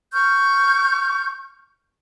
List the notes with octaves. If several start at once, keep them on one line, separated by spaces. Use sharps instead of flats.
C#6 F6 G6